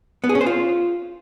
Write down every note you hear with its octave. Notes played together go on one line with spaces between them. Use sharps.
B3
G#4
C#4
C5
F4